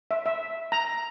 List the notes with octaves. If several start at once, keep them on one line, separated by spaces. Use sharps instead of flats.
E5
E5
A#5